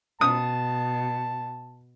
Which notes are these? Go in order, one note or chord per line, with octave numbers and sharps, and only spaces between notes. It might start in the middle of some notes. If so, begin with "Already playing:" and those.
B2 A5 D#6